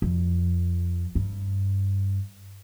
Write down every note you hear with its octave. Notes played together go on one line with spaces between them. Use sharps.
F2
G2